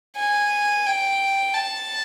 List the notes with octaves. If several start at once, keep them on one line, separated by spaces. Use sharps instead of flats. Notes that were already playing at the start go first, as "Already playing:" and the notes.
G#5
G5
A5